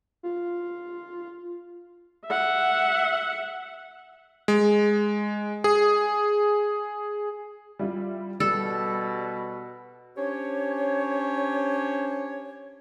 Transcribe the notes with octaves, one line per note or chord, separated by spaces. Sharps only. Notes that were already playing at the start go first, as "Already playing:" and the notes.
F4
E5 F#5
G#3
G#4
G3 E4 F4
B2 G3 A4
C#4 D4 G4 C5 C#5